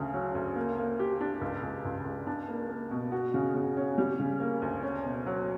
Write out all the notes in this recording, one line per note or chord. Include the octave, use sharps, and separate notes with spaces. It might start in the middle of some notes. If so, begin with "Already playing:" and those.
Already playing: D2 C#3
F#3
D2
A#3
A#3
G4
D4
C#2
C#2
C#2
C#2
D4
A#3
A#3
B2
F#4
C#3
C#3
C#4
G3
C#3
A#3
D2
C#4
B2
F#3